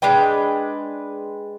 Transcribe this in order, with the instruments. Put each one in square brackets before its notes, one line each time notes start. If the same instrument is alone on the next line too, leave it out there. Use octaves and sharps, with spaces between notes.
[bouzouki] G#3 D4 B4 G5